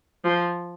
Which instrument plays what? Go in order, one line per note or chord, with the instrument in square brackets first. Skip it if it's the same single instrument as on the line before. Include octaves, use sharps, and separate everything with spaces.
[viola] F3